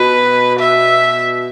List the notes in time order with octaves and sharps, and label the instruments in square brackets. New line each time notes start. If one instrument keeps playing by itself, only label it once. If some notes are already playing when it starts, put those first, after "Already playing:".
Already playing: [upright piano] B2 [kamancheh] B4
[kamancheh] E5